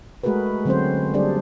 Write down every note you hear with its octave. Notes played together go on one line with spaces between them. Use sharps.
G#3 A3 F#4 G#4 A#4 B4
D3 F#3 C4 C#4 F#4 C5
G3 A#3 D4 G#4 C5 D5